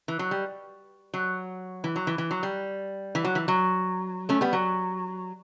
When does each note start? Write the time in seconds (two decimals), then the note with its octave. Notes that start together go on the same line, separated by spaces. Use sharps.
0.08 E3
0.19 F#3
0.31 G3
1.14 F#3
1.84 E3
1.96 F#3
2.07 E3
2.18 E3
2.31 F#3
2.43 G3
3.15 E3
3.24 F#3
3.35 E3
3.48 F#3
4.29 A3 C#4
4.41 G3 B3
4.53 F#3